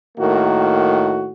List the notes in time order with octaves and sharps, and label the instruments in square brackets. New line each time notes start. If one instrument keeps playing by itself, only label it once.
[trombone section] A2 D#3 A#3 F#4